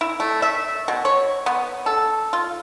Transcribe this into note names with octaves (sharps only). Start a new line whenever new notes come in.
E4
A3
E5
B2
C#5
B3
A4
F4